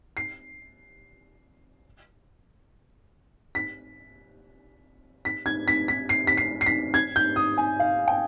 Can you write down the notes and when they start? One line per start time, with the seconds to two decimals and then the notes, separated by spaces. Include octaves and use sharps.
0.17 C7
3.55 B6
5.25 B6
5.46 G#6
5.68 B6
5.88 B6
6.09 C7
6.27 B6
6.37 C7
6.61 C7
6.66 B6
6.94 G#6
7.16 G6
7.36 D#6
7.58 G#5
7.79 F5
8.08 G5